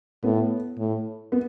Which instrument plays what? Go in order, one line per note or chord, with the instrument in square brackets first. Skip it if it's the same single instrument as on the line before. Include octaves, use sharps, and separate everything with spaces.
[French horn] A2 [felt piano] B3
[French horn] A2
[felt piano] B3